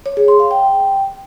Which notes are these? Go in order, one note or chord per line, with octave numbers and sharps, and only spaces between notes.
C#5
G#4
C6
F5
G5